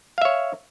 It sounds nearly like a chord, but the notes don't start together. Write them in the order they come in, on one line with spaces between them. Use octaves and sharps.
F5 E5 C#5